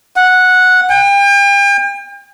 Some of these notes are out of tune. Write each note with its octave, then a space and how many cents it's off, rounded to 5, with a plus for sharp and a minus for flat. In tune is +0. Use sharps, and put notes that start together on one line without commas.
F#5 -10
G5 +40